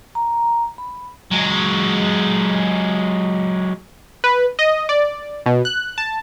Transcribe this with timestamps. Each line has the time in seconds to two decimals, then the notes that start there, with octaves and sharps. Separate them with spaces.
0.15 A#5
0.78 B5
1.31 F#3 G#3
4.24 B4
4.59 D#5
4.89 D5
5.46 B2
5.65 F#6
5.98 A5